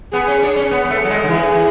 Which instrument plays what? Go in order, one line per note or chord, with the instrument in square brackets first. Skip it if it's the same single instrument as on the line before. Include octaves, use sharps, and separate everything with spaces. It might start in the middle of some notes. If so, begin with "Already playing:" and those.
[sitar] B3 [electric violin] G#4
[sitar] C#4
D4
C#4
B3
B3
A3
F#3
G#3
D3
[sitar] E3 [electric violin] G#4